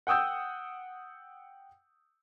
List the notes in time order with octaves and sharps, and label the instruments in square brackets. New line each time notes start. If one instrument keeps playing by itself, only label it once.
[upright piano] F#5 G5 D#6 E6 G6